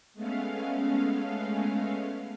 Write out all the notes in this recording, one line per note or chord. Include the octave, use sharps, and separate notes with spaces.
G#3 A3 B3 C#4 F5